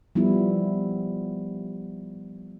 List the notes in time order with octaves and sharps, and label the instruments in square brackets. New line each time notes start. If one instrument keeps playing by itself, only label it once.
[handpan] F3 G3 B3 E4